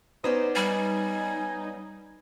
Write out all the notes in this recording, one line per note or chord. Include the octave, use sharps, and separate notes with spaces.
B3 C#4 D#4 C5 D5
G3 G#5